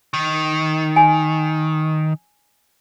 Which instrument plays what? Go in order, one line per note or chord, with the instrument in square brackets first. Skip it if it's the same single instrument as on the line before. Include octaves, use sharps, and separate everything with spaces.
[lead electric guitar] D#3
[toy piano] G#5